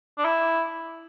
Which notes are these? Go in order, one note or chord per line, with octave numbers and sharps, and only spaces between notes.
D4
E4